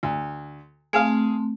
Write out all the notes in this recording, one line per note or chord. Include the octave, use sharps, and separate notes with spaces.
D2
A3 C4 G#4 F5